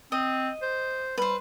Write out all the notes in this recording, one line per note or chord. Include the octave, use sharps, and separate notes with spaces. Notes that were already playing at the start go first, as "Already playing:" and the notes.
C4 D#5
C5
G3 B4 C5